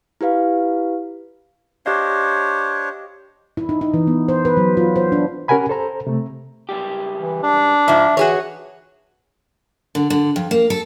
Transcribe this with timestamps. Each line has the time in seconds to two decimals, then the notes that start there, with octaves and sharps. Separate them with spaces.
0.21 E4 G4 B4 F5
1.86 D4 G4 C5 C#5 D#5 F5
3.57 E4
3.69 D#4
3.81 D#4
3.94 E3
4.07 B3
4.28 C5
4.45 B4
4.57 F#3
4.77 F4
4.96 C5
5.12 D4
5.48 C#4 G4 A#4 F#5 G#5 B5
5.69 A4 C5 A#5
6.07 C3 A3
6.69 C#2 G3 G4
7.20 E3
7.43 D4
7.88 G#2 F3 E5
8.17 E3 F#4 G#4 C#5
9.95 D3
10.10 D3
10.36 F2
10.51 A#3
10.70 A4